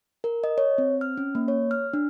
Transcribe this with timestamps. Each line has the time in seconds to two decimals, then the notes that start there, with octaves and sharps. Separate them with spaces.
0.24 A#4
0.44 D#5
0.58 C#5
0.78 C4
1.01 F6
1.18 C#4
1.35 A#3
1.48 C#5
1.71 F6
1.93 D4